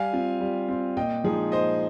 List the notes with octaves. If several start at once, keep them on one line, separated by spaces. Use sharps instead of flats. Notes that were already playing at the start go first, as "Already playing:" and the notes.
Already playing: G3 F5 G#5
C4 F4
G3
C4 F4
A#2 D#5 G5
F3 G#3 D#4 G#4
A#2 C5 D#5